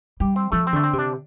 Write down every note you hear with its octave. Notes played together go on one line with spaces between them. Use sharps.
G3 G4
C4
F3 A3
C4
D3 A3
C4
C3
D4